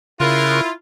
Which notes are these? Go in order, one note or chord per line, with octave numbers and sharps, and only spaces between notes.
C#3 E4 F4 A#4 F#6